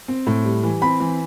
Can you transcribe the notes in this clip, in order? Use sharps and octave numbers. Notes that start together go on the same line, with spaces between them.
C4
A2
G3
E3
C4 B5
E3